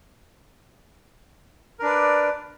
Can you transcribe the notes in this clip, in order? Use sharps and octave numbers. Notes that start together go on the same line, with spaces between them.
D4 A#4 B4 D5